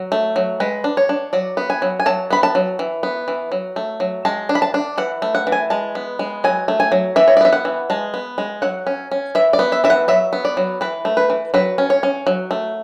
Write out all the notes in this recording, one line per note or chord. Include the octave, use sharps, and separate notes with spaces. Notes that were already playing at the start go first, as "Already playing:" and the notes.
Already playing: F#3
A3
F#3
G#3 B4
D4
C#5
D4
F#3 D5
B3
G#5
F#3
G#5
F#3 A5
B3 B5
A5
F#3
E3
B3
E3
F#3
A3
F#3
G#3 A5
D4
B5
A5
D4
E3 F#5
A3
F#5
E3
G#5
G#3 A5
B3
G#3
F#3 G#5
A3
G#5
F#3
E3 E5
C#5
D5
B3 E5
F#5
E3
G#3 A5
B3
G#3
F#3 F#5
C#4
C#4
E3 E5
D5
B3
E5
E3 E5
F#5
F#3 E5
B3
D5
F#3
E3 B4
A3
B4
E3
F#3 B4
C#4
C#5
C#4
F#3
A3